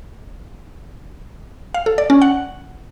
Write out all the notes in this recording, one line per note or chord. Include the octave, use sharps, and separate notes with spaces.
F5
A4
D5
C#4
F#5